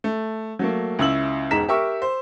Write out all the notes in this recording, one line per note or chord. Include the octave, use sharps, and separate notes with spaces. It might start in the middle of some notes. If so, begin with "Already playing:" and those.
A3
F#3 A3 A#3
C#2 C#4 E4 E6 F#7
E1 G#2 G#3 A#5 B6 E7
G4 A#4 E5 C#6 E6
C5